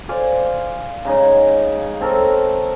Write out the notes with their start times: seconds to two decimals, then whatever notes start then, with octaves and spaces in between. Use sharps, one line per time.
0.09 C5 D5 F5 G#5
1.05 C#3 G#3 D#4 G#4
2.01 C4 A4 A#4 C#5